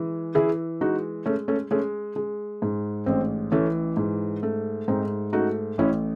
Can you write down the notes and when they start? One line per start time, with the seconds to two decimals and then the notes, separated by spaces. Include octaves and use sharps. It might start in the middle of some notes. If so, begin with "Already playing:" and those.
Already playing: E3 G#3
0.35 E3 E4 G#4
0.81 G#3 D#4 F#4
1.26 G#3 A3 C#4
1.48 A3 C#4
1.71 G#3 A3 C#4
2.16 G#3
2.62 G#2
3.06 A1 C4
3.52 E3 A3 C#4
3.97 G#2
4.43 A3
4.88 G#2 C4 D#4
5.33 A3 D#4 F#4
5.78 A1 C#4 E4